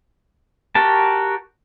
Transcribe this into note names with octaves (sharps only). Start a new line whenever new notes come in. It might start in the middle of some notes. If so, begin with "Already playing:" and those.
F#4 G4 A#4 A5